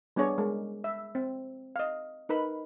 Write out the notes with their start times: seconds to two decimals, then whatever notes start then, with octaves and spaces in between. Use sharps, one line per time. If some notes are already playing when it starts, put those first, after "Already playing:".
0.16 G3 B3 D4 G#4 C#5 D5
0.38 G#3 A#4
0.84 E5
1.15 C4
1.76 D#5 F5
2.29 D#4 A#4 B4 B5